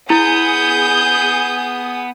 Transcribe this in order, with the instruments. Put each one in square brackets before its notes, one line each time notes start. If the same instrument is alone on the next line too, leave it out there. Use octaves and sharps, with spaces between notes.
[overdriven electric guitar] B3 [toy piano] E4 [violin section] G#4 G#5 D#6 [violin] G6